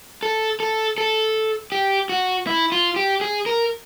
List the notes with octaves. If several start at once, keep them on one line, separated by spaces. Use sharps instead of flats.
A4
A4
A4
G4
F#4
E4
F4
G4
G#4
A#4